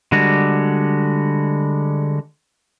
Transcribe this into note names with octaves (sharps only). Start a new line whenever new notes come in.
D3 G3 G#3 F#4